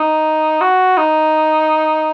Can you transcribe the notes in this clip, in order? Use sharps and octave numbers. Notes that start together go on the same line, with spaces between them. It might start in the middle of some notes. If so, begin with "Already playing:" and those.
Already playing: D#4
F#4
D#4